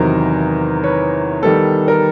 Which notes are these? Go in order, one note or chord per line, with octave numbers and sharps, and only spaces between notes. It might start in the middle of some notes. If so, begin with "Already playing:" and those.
Already playing: E2 C3 D#3 F#3 A#4 C5
B4 C#5
D#3 G3 B3 A4
A#4